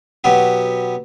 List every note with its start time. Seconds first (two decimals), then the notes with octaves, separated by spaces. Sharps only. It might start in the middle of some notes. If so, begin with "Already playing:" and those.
0.24 B2 F#3 B3 G4